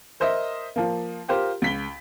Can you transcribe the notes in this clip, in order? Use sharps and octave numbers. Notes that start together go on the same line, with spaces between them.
A#4 C5 D#5 E5
F3 A#3
F4 G4 A#4 C5
C#2 B6 G7